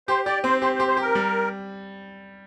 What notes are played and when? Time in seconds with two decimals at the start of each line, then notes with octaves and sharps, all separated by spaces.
0.08 G4 C5
0.26 G4 D5
0.44 C4 C5
0.62 G4 C5
0.75 C5
0.80 G4
0.88 C5
0.97 G4 A#4
1.15 G3